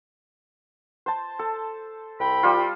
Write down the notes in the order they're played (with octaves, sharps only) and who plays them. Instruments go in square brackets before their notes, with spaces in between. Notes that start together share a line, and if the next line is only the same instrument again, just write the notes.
[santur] C5 A5
A4
[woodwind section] C2 G5 B5
[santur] G3 F4